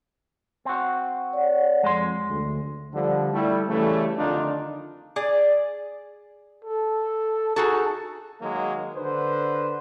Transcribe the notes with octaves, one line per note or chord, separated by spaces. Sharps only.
C4 F#4
C#5 D5 F#5
F2 G#3 C6
D2
D3 F3 G3
G3 A3 E4
C#3 E3 G3 A3
F2 D3 D#3 D4 D#4 F4
G#4 D5
A4
D#4 F#4 G#4 A4
D#3 F#3 G#3 A#3
D3 B4 C5